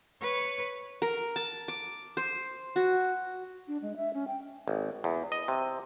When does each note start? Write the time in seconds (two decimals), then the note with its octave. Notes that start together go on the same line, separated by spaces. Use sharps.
0.21 B4 C#5
1.02 A#4
1.36 A5
1.68 D6
2.17 C5
2.76 F#4
3.68 D4
3.82 G#3
3.97 E5
4.14 C#4
4.28 G5
4.68 G#1
5.04 E2
5.32 D#5
5.48 C3